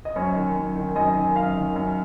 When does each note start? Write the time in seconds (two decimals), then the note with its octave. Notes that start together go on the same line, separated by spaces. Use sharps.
0.05 D#5
0.16 F#2 C#5
0.35 D#3
0.56 F#2
0.76 D#3
0.95 F#2 D#5
1.16 D#3
1.36 F#2 F5
1.56 D#3
1.76 F#2